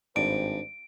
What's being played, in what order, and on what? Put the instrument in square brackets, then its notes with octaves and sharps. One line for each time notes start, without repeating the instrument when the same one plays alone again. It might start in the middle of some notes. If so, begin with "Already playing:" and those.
[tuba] G#1 [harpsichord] G2 [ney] C5 [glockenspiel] D7